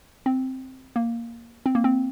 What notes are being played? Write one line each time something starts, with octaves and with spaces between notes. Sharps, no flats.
C4
A#3
C4
A#3
C4